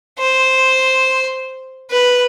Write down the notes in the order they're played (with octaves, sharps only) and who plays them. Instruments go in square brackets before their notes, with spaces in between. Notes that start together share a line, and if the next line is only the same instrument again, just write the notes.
[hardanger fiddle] C5
B4